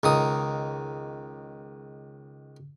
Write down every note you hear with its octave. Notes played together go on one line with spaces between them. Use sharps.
C#2 D#3 D#6